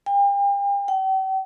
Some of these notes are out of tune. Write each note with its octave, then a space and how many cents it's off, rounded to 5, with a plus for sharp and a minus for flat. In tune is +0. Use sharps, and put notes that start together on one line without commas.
G5 +40
G5 -45